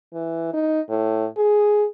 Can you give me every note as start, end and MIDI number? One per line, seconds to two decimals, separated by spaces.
0.14 0.49 52
0.54 0.81 63
0.89 1.27 45
1.37 1.86 68